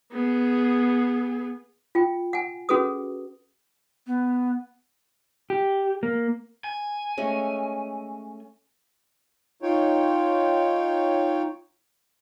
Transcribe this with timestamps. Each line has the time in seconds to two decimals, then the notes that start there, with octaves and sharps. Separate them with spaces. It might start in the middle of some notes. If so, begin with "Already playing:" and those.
0.12 B3 G#4
1.95 F4 G5
2.33 F#5 G#5
2.69 C#4 F#4 G#4 A4 B4 D#6
4.07 B3
5.50 G4
6.03 A#3
6.64 G#5
7.18 G#3 A3 C#4
9.62 D#4 F4 C#5 G5